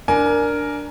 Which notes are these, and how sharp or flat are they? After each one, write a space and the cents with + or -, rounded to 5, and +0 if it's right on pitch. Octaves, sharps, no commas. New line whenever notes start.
D4 +0 A#4 +0 G#5 +20